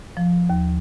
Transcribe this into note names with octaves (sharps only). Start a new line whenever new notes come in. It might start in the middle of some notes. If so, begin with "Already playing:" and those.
F3
D#2